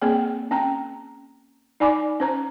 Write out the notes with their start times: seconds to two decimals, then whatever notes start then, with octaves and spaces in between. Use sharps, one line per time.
0.02 A#3 C4 G#4 G5
0.51 C#4 G5 A#5
1.80 D#4 D5 G#5 B5 D6
2.20 C#4 C5 A#5